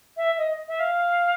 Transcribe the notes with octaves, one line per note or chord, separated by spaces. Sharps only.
E5
D#5
E5
F5